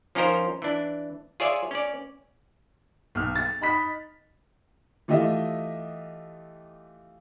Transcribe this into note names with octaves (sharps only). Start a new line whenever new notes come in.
F3 C#4 D#4 F4 A#4 C5
E3 D4
F4 G#4 C#5 D5 E5
C#4 D5
B1 F6
A6
D#4 B5 B6
E3 A3 F4 G4 D#5 E5